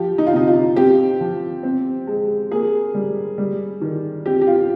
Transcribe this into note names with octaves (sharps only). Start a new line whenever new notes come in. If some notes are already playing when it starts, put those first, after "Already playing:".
Already playing: F3 G4
D#4
F4
C3 D#4
F4
C4 G4
F3
C4
G#3
A#3 G#4
G3
G3
D#3
C4 G4
G4
F4